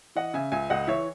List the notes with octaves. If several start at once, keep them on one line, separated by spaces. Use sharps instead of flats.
E3 D#5 F#5
C#3 E5 G#5
C#2 E5 G#5
C#2 D#5 F#5
E3 C#5 E5